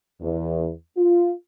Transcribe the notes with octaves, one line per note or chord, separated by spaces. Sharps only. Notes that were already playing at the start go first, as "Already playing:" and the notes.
E2
F4